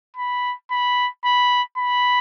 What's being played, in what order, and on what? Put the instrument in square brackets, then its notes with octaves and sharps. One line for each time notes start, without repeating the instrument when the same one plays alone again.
[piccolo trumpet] B5
B5
B5
B5